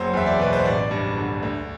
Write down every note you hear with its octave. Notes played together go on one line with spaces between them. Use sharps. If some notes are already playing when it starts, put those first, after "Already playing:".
Already playing: F#1 F#3 C5
E2 E5
D5
B2 B4
C5
A1 D5
G2
D3
D2